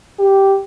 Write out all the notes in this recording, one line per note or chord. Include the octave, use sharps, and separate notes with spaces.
G4